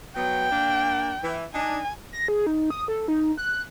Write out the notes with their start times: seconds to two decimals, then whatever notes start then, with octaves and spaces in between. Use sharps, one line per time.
0.16 F#3 B3 G5
0.51 A#3 D4
1.23 E3
1.54 D4 D#4 G#5
2.13 A#6
2.28 G#4
2.47 D#4
2.70 D#6
2.88 A4
3.08 D#4
3.37 F#6